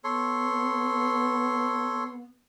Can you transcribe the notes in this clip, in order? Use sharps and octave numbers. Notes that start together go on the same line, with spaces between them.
B3 A4 C#5 C6